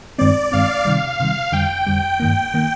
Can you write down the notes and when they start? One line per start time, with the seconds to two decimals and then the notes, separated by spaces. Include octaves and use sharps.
0.18 G2 D#3 G#3 C4 D5
0.52 G2 D#3 G#3 C4 F5
0.85 C3 D#3 G3 F5
1.19 C3 D#3 G3 F5
1.52 F2 D3 G3 G5
1.87 F2 D3 G3
2.20 G2 D#3 A#3
2.54 D#3 A#3